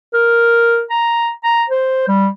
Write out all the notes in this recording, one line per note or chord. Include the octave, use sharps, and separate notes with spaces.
A#4
A#5
A#5
C5
G3